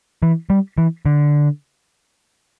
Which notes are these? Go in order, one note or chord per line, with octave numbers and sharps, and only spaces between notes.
E3
G3
E3
D3